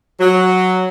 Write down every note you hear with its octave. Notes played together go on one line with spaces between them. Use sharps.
F#3